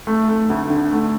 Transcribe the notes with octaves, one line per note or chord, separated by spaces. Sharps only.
A3
A3
D2
D3
A3